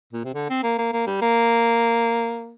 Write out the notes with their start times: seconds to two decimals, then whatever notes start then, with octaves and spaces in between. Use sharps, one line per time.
0.13 A#2
0.25 C3
0.34 D3
0.50 C4
0.63 A#3
0.78 A#3
0.93 A#3
1.07 G3
1.22 A#3